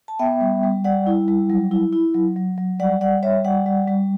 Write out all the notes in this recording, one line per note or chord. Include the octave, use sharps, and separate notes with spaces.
A5
B3 E5 G5
G3
G3
G3 D5 F#5
E4
G3
F#3
E4
E4
F#3
F#3
F#3
G3 D5 F#5
G3 D5 F#5
G3 C#5 E5
G3 D5 F#5
G3
G3